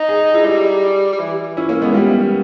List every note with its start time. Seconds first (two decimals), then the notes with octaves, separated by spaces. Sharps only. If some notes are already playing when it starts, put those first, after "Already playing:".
Already playing: D#4
0.09 G#4
0.34 E4 G#4
0.45 G3
1.13 G3
1.19 E3
1.57 C#4 E4
1.69 A#3 C#4
1.82 G#3 B3
1.94 G3 A#3